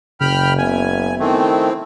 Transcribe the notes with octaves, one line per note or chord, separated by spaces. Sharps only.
F#1 C#3 G5 B5 F6
B3 E5 G#5
D#3 E3 A3 C4